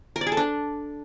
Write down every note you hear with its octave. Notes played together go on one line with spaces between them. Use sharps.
A#4
D5
G#4
A4
D4